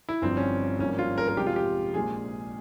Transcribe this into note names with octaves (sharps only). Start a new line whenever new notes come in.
E4
G1 G2 F3 C4
C#4
G#1 G2 F3 A#3 C#4
F4
A#4
A#4
F2 C3 F3 G#3 G4
F4
G4
A#1 A#2 G#3 G#4